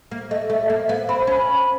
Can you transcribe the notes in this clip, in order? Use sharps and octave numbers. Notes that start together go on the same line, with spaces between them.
A#3
A3 D#5
A3 E5
D#5
A#3 E5
B3 F5
C4 B5
C#4 B5